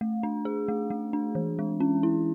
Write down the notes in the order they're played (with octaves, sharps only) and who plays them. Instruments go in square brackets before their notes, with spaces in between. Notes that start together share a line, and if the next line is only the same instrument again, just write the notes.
[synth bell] A3
D4
G#4
A3
A3
D4
E3
G#3
C#4
E4